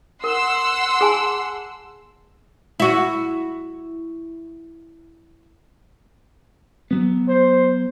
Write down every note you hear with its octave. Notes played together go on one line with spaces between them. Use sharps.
A#4 F#5 C6 E6
G#4 G#5 A5
E4 F#4
F#3 B3
C5